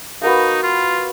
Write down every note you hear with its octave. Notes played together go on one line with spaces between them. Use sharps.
B3 D#4 F#4 A#4 F5
F4